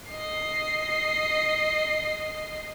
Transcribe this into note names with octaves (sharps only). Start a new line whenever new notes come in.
D#5 C7